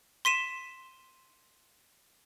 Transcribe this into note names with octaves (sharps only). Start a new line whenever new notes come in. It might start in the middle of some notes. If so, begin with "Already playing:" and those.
C6 B6 D#7 E7